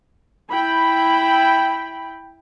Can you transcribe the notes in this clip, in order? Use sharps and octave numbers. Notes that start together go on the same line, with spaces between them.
E4 G5 B5